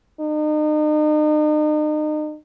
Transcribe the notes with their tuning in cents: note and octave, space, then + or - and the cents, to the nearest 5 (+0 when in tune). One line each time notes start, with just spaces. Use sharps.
D#4 -40